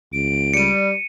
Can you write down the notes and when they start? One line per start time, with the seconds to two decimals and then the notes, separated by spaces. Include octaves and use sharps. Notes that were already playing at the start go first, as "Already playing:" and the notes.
0.13 C#2 D7
0.54 G3 C#7 D#7